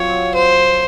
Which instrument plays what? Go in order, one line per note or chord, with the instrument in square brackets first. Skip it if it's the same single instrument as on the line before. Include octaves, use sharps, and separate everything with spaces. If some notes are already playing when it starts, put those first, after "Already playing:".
Already playing: [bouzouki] F#3 C4 F4 [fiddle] C#5
[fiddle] C5